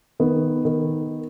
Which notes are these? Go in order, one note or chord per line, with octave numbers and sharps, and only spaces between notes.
D#3 B3
D#3